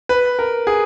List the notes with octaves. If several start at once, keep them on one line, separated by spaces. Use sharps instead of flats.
B4
A#4
G#4